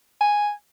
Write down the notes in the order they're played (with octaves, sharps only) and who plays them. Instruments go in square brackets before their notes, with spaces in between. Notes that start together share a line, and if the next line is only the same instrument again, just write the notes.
[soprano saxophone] G#5